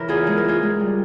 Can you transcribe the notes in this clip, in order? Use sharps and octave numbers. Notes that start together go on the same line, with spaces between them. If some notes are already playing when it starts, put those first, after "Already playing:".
Already playing: C#3 E3 A#4
E2 F4 G#4
G#3 G#4
A#4
G#3 F4 G#4
G#3
G3